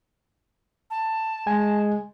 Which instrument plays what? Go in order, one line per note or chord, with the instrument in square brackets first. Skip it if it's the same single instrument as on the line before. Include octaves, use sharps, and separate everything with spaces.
[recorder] A5
[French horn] G#3 [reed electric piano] G#5